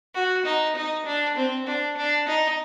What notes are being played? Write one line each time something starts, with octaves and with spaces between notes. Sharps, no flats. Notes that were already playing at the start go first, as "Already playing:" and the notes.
F#4
D#4
D#4
D4
C4
D4
D4
D#4